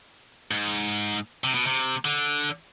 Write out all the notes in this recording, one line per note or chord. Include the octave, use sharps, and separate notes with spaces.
G#2
C3
B2
C3
D3